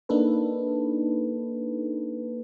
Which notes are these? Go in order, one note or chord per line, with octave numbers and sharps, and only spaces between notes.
A#3 D4 D#4 A4 B4